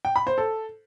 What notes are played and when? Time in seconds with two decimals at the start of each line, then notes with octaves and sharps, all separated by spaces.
0.05 G5
0.16 B5
0.27 C5
0.38 A4